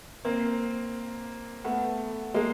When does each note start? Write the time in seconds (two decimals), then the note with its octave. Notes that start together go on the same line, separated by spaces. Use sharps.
0.25 A#3 C4
1.64 A3 B3
2.34 G#3 A#3